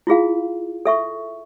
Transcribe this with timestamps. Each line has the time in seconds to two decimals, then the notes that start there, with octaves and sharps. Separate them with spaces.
0.07 E4 F4 G#4 F5
0.86 A4 E5 C#6